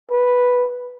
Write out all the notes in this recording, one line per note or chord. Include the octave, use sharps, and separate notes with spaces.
B4